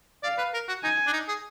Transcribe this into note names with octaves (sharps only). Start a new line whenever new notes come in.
D5 F5
B4
A#4
F#4
D#4 G#5
D4
D#4
G#4